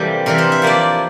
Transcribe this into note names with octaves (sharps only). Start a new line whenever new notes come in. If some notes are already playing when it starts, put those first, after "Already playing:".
Already playing: C3 E3 G3 A#3 A4
C3 E3 G3 A#4
C5
E5
F3 A#3 E4 D5